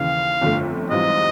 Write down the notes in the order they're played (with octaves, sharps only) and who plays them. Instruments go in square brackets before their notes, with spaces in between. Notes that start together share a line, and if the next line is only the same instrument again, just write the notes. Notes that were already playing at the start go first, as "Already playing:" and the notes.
Already playing: [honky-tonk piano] D#2 C#3 E3 [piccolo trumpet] F5
[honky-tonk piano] G1 F2 D3 F3 A3
[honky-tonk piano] G#2 E3 G3 C4 F4 [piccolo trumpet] D#5